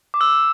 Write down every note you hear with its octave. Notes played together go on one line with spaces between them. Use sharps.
D6
E6